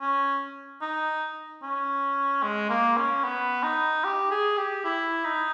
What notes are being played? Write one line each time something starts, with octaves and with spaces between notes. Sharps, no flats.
C#4
D#4
C#4
G#3
A#3
C#4
B3
D#4
G4
G#4
G4
E4
D#4